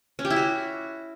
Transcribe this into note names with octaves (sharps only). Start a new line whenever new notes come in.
C#4
G4
E4
F#4